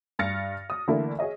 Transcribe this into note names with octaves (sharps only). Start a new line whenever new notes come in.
G2 F6 A6 A#6 C#7
D#6
D3 E3 A3 A#3 D4 E4
G#4 C#5 D#5 E5